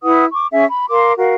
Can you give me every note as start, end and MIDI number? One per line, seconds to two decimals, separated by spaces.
0.02 0.25 64
0.02 0.25 71
0.02 0.25 78
0.02 0.25 87
0.32 0.47 85
0.32 0.47 86
0.52 0.64 61
0.52 0.64 68
0.52 0.64 76
0.52 0.64 80
0.68 0.87 83
0.89 1.13 70
0.89 1.13 77
0.89 1.13 84
0.89 1.13 86
1.17 1.35 66
1.17 1.35 70
1.17 1.35 77